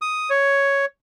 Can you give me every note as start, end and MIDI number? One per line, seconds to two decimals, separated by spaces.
0.02 0.30 87
0.30 0.85 73